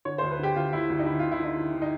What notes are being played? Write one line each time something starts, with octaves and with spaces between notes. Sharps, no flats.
D3 C#5
C5
D2
B4
D3 G4
D2 F4
D2 E4
D2
D#4
D3 E4
D3 F4
E4
D3 D#4
D3
D3
D#4